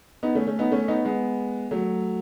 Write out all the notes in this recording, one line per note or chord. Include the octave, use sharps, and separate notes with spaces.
B3 D#4
A3 C#4
A3 C#4
B3 D#4
A3 C#4
B3 D#4
G#3 B3
F#3 A3